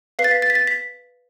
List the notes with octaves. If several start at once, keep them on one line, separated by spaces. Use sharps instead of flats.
B4 F5 C7
A6
B6
A6
B6
A6
B6